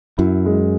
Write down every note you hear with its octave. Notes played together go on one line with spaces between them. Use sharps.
F#2 E4
G#3